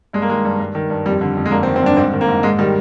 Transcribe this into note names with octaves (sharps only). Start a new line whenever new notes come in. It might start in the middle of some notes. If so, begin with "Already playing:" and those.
G2 G#3
A#3
D#3 G#3
G2
G2
D#3
G2
F2 G3
D3
F2
G#3
G2 A#3
C4
D#3
C4
G2 D4
G#2 C4
D#3
A#3
G#2
G#2 G#3
D#3 G3